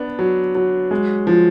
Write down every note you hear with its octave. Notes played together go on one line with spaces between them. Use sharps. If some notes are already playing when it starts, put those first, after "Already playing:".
Already playing: B3 D4
F#3
F#3
G#3
F3